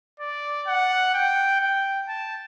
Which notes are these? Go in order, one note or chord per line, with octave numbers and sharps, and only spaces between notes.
D5
F#5
G5
G5
A5